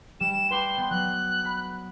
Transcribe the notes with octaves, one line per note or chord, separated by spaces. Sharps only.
G3 E7
B4 G5 C6 D6
B3 G4
F#3 F#6
B5